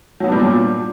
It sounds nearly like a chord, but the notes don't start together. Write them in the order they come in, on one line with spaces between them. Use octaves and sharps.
F#3 B3 D4 G3 A#2